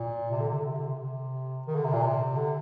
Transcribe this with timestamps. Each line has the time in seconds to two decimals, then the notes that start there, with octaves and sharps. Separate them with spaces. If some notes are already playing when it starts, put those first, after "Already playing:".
Already playing: A#2
0.31 C3
0.39 D3
0.49 C3
0.57 D3
0.66 C3
0.75 D3
0.83 C3
0.99 C3
1.67 D#3
1.76 D3
1.84 C3
1.93 A#2
2.02 C3
2.36 D3